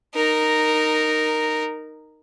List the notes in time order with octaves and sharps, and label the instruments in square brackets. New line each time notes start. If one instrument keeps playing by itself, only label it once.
[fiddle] D#4 A#4